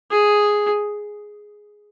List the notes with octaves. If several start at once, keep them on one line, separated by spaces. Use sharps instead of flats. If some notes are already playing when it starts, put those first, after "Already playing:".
G#4